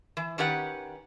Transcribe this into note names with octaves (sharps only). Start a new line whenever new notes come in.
E3
D#3 C#4 G4 B4 F#5